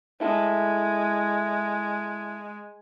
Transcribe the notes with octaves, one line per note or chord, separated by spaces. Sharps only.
G#3 E4 A4